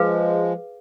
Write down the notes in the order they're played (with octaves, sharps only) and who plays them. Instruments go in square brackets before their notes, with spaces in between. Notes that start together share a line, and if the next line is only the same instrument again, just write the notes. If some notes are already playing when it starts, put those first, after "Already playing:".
Already playing: [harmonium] F3 G#3 [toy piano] G#4 B4 F5